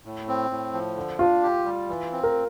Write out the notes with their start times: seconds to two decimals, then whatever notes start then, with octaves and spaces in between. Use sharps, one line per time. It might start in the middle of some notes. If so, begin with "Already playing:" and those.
0.05 A2
0.28 C4
0.51 A2
0.73 F3
0.96 D3
1.19 D4 F4
1.43 G4
1.65 G3
1.89 E3
2.12 C4
2.23 A#4